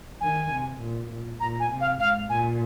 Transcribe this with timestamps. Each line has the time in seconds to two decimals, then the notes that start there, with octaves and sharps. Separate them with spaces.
0.21 D#3 G#5
0.51 C3
0.80 A#2
1.10 A#2
1.40 A#2 A#5
1.60 G#5
1.70 C3
1.81 F5
2.00 G#2 F5
2.30 A#2 G#5